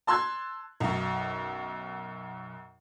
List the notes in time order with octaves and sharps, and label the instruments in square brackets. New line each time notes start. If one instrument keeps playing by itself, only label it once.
[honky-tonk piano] A5 C6 E6 F#6 G#6
B1 F#2